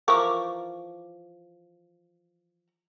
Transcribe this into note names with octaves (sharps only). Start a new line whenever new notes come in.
E3 F3 A#4 C#6 D6